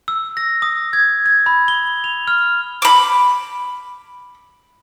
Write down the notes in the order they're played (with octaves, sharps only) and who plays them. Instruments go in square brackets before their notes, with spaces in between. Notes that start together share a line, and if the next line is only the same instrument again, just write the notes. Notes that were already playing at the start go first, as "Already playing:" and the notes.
[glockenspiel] E6
A#6
D#6
G#6
G#6
B5
G7
F7
F6
[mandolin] B5 D6